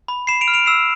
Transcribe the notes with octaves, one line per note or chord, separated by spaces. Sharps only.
B5
B5 C7 E7
D7 F7
F6
D7 F7
E6 C7 E7